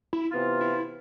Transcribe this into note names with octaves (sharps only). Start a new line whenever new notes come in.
E4
C3 E3 B3 F4
E4